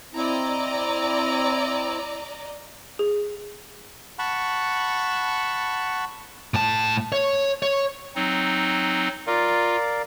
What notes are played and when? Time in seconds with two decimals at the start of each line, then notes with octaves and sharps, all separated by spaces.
0.14 C4 E4 D5 D#5 A#5
2.99 G#4
4.19 F#5 A5 B5 C#6
6.54 A2 A5
7.12 C#5
7.62 C#5
8.16 F#3 C4 D#4
9.27 F4 A#4 D5 F5